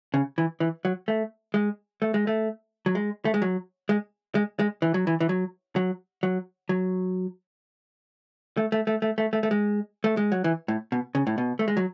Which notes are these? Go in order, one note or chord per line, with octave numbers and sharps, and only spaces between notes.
C#3
E3
E3
F#3
A3
G#3
A3
G#3
A3
F#3
G#3
A3
G#3
F#3
G#3
G#3
G#3
E3
F#3
E3
E3
F#3
F#3
F#3
F#3
A3
A3
A3
A3
A3
A3
A3
G#3
A3
G#3
F#3
E3
A2
B2
C#3
A2
B2
A3
G#3
F#3